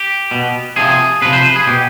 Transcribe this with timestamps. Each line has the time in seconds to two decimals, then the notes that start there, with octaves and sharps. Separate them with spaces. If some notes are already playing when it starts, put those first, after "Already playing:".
Already playing: G4
0.31 B2
0.76 C3 F3 G#4
1.22 C3 F3 B4
1.33 C5
1.44 B4
1.56 G#4
1.67 B2 G4